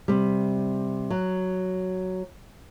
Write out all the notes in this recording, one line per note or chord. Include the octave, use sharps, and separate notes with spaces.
C3 G3
F#3